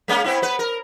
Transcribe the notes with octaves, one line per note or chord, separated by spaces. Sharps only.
G#3 A#3 C#4
B3 C4 E4
B3 B4
A#4